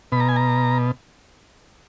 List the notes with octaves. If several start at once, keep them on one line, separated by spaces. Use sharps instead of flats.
B2 B5
A#5
G#5
A#5